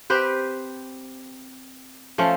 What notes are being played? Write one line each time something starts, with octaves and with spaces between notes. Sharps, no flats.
C4 G4 B4 C5
F3 A3 C#4 F4